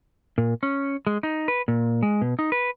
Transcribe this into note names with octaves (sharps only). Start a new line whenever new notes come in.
A#2
C#4
G#3
D#4
B4
A#2
G#3
B2
D#4
B4